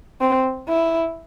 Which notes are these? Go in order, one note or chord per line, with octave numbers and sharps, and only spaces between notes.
C4
E4